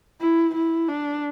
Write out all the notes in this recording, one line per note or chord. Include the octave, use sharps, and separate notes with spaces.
E4
E4
D4